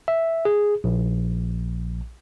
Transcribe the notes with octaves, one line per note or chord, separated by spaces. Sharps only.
E5
G#4
A#1